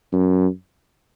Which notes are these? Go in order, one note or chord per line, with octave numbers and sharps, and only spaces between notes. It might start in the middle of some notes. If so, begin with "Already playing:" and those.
F#2